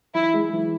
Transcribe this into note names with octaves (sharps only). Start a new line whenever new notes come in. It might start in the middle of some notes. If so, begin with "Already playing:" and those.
E3 E4
G#3
E3